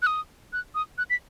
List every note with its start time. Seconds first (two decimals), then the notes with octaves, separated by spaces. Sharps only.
0.02 F#6
0.07 D#6
0.53 F#6
0.75 D#6
0.98 F#6
1.10 B6